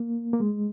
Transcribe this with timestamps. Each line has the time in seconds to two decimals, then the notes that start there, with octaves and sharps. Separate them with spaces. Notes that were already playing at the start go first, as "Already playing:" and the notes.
Already playing: A#3
0.33 A#3
0.40 G#3